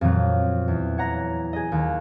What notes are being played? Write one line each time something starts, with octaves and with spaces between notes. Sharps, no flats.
F2 A#2 F3 F#3
E2
C#5 F#5 A#5 A#6
G#4 D#5
D#2